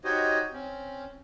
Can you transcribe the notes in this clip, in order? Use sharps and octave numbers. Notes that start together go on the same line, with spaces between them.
D#4 F#4 G4 C5 C#5 D#5
C4 C#4